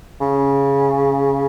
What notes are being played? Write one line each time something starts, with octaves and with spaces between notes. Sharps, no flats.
C#3